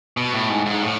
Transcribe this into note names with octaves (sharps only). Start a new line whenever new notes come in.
B2
A2
G#2
G#2
A2